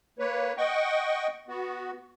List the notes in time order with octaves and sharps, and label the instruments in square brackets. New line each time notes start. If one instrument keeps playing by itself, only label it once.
[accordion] A#3 B4 C#5
D#5 F#5 G5 C#6
B3 F#4